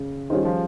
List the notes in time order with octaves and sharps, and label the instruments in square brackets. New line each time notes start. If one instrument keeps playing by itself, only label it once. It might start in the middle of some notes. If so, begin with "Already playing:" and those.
Already playing: [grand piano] C#3
[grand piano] D#3 [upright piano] G3 C#4 F4 G#4 C5
[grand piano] F3